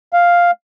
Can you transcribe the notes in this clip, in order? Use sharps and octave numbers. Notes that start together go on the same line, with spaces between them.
F5